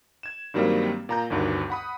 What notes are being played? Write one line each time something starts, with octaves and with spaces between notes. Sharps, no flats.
G#6 E7
G2 D#3 F#3 G3 A#3 C4
A#2 A#5 G6
G1 D2 G2 D#3 F#4
F#5 B5 D#6